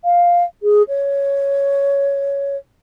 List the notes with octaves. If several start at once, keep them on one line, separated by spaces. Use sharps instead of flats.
F5
G#4
C#5